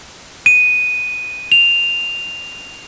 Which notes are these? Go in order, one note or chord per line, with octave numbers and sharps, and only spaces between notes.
D#7
F7